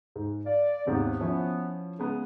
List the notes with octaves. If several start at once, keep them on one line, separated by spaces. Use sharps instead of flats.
G#2
D5 F5
D#2 G#2 C3 B3
F3 C#4 E4
C#3 G#3 B3